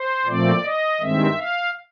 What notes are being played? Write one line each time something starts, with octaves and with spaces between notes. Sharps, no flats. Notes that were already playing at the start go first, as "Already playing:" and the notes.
Already playing: C5
A#2 F3 A3 C4 D5
D#5
G2 D#3 G#3 C4 E5
F5